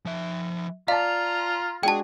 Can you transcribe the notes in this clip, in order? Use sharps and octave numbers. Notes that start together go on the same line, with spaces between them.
F3 E5
F4 D5 F5 A5 A#5
G#3 D4 F#4 G#4 G5 A5